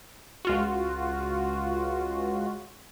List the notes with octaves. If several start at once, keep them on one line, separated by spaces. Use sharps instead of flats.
C#2 F4 F#4